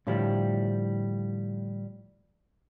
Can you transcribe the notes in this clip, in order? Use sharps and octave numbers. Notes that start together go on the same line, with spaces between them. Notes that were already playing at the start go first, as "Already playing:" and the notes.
A2 D3 F3 G3